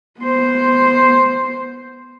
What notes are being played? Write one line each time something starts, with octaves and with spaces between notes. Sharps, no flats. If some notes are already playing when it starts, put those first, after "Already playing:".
B3 C5